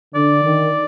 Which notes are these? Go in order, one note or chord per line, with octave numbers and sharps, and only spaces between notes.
D3 D5
D#3